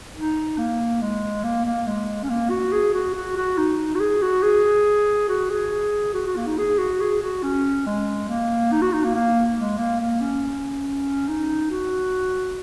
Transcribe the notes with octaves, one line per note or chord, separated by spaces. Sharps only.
D#4
A#3
G#3
A#3
A#3
G#3
C#4
A#3
F#4
G#4
F#4
F#4
F#4
D#4
F#4
G#4
F#4
G#4
F#4
G#4
F#4
F#4
A#3
D#4
G#4
F#4
G#4
F#4
C#4
G#3
A#3
D#4
F#4
D#4
A#3
A#3
G#3
A#3
A#3
C#4
D#4
F#4